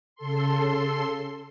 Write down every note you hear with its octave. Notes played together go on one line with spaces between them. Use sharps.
C#3 A4 C6